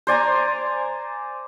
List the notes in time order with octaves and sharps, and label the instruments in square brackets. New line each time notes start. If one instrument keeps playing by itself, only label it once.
[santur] C5 D5 G#5 A#5